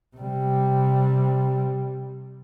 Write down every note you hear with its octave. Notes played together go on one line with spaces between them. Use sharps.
C3 G3